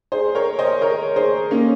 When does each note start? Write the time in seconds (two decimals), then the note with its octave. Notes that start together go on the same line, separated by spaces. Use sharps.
0.12 G#4 C5
0.35 A#4 C#5
0.59 C5 D#5
0.81 A#4 C#5
1.16 G#4 C5
1.51 A#3 C#4